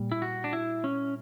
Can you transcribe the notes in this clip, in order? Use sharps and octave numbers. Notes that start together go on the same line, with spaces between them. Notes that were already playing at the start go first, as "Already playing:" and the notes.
Already playing: A#2 G3
E4
F#4
D4
E4
C#4